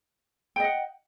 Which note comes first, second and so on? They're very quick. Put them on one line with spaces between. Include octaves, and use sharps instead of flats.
G5 D#5 F#5